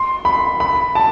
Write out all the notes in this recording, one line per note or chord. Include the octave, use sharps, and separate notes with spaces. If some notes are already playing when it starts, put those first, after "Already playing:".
Already playing: C6
B5
B5
A5